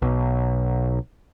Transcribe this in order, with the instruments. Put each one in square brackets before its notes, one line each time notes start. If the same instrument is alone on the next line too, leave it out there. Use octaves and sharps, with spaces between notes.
[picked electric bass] B1